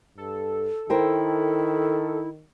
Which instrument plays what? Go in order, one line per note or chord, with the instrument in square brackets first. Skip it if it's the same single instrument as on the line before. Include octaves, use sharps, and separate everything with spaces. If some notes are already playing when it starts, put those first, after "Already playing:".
[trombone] G2 [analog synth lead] A4
[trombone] D#3 [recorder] E4 [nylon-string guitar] A#4 C5 G5